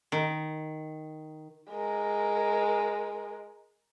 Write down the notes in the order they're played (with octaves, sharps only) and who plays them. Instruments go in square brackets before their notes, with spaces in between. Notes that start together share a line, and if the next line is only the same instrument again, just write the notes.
[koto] D#3
[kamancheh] G#3 A#4